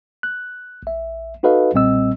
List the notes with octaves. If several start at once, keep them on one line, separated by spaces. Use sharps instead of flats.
F#6
A#1 E5
D#4 F#4 A4 B4 D#5 F5
B1 A#2 G3 C4 D#5 E6